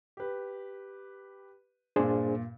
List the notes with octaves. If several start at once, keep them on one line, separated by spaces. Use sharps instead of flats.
G4 B4
G2 A#2 D4 G#4 C5